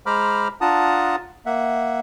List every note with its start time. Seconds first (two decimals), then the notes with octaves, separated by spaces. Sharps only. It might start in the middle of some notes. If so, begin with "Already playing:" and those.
0.06 G#3 C5 A#5 B5 D6 F6
0.61 D4 F4 F#5 A5 A#5 D#6
1.46 A#3 E5 F#5